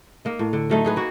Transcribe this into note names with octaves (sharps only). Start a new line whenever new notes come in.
A#3 D#4
A2
D3
F#3 A3 D#4
D#4 G#4 B4
A#3 F#4